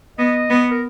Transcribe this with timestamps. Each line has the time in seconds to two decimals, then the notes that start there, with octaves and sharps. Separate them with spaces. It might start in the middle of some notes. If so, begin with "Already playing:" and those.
0.18 B3 D#5
0.50 B3
0.71 A#4